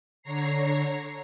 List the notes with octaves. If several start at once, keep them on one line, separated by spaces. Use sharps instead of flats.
D3 C#5 A#5 C7